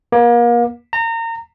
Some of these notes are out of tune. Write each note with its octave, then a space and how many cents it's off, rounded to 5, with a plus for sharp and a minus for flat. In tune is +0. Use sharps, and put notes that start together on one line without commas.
A#3 +35
A#5 -30